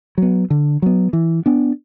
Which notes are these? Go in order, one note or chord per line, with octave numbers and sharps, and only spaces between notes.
F#3 B3
D3
F#3 B3
E3
B3 D4